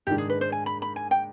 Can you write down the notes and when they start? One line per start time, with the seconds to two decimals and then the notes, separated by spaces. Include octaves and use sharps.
0.07 G#2 D#3 G#3 D4 G4
0.18 G#4
0.30 B4
0.41 C5
0.52 G#5
0.66 B5
0.82 B5
0.96 G#5
1.11 G5